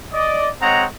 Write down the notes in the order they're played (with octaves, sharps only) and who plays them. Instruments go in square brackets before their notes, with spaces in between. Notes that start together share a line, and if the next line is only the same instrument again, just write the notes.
[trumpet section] D5 D#5
G#3 C4 C#5 D#5 F#5 A#5